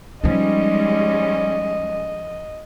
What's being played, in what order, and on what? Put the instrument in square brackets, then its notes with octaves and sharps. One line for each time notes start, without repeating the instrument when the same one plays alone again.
[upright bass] F3 D#4 [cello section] G3 G#3 C#4 [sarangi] D#5